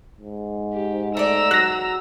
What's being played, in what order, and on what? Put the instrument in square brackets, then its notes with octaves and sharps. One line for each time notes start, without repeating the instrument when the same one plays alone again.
[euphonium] G#2
[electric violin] G4
[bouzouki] A3 D5 [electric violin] A#5 E6
[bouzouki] F#3 [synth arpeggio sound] F#6 A#6